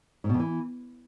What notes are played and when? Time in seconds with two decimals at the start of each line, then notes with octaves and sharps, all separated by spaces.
0.24 G#2
0.29 B2
0.34 F2
0.39 E3